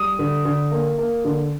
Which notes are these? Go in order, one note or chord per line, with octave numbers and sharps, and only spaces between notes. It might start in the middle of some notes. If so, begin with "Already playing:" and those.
Already playing: G3 D#6
D3
D3
A#3
A#3
D3